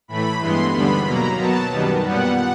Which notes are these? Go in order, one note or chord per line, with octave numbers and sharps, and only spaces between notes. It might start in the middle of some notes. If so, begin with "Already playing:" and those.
A2 E3 A3 B5
G2 E3 G#3 B3 C6
D#2 D3 G3 B3 B5
B2 F#3 A#3 A#5
B2 F#3 B3 A5
F#2 D#3 G3 B3
A#2 G3 B3 F#5